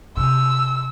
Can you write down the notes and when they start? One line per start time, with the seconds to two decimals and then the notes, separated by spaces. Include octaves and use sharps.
0.17 C3 E6